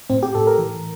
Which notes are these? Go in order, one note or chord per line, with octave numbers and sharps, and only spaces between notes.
A2 C4
G4
A2 A4
A#4
E3